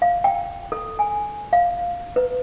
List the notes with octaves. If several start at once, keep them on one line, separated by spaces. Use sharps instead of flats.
F5
G5
A4
G#5
F5
B4